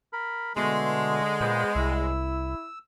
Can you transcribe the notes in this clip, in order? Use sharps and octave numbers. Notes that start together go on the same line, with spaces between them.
A#4 B5
B2 D3 G#3 A3 C6
A#2 B3 C5
C2 E4 E6